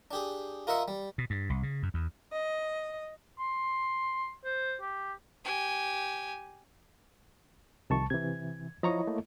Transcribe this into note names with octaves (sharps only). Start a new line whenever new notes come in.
D4 G4 G#4
F4 A#4 D#5 E5 F#5
G3
B2
G2
C2
C#3
F#2
E2
D#5
C6
C5
G4
G4 G#5
C2 C3 D#3 F3 A5 C#6
C3 E3 G#6
F3 E4 C#5 D#5 A#5 C#6
A3 A#3